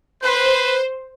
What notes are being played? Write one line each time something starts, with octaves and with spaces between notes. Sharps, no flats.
B4 C5